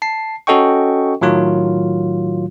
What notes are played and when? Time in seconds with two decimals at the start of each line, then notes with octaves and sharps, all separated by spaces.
0.02 A5 C7
0.47 C#4 F#4 A4 D#5 G5 C#6
1.21 A2 D#3 F#3 F4